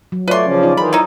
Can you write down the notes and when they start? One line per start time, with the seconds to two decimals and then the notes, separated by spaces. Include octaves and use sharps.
0.12 F#3
0.28 A3 F4 B4 C#5 D5 C6
0.46 C#3 F3 C#4
0.63 D#4 F4 D5
0.77 D#3 E3 G#4 C5 B5
0.93 D#4 E4